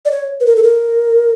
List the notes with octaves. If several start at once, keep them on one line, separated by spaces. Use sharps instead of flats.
D5
C#5
B4
A#4
A4
A#4